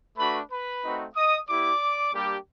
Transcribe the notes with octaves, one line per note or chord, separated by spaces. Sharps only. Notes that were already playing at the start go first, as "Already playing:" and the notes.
A3 D4 F#4 B4 B5
B4 B5
A3 C4 D#4 F#4
D#5 D#6
B3 E4 G4 D5 D6
G3 A#3 D4 G4